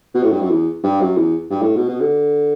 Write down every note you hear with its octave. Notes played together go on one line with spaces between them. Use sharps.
B2
A2
G2
F#2
E2
G2
F#2
E2
G2
A2
B2
B2
D3